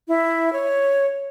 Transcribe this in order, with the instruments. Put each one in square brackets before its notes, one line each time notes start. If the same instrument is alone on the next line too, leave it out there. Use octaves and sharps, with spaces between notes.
[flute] E4
C#5